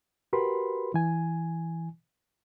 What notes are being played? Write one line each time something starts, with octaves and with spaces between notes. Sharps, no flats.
F#4 G4 A#4 B4 B5 C6
E3 G#5